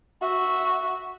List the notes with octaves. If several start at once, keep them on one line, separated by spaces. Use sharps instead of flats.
F#4 E5